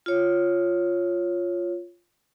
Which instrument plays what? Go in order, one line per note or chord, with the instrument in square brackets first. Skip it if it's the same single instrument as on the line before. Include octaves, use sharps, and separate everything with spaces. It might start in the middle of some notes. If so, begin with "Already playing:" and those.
[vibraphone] F4 C#5